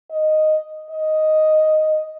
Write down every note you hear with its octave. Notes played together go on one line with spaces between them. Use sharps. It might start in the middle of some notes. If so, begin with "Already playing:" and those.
D#5
D#5